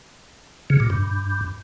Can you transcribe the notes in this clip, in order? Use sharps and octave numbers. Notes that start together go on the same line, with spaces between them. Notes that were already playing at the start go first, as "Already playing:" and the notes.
C#3
A#2
G2